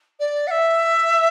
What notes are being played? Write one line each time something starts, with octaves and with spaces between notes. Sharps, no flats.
D5
F#5
E5